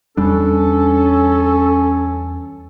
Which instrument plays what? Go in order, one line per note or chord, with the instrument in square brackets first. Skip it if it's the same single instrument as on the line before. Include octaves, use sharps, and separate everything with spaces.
[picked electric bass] E2 G3 D4 [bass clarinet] C#4 [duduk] A4